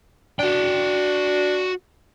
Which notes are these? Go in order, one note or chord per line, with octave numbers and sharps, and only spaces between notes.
D4 F#4 G5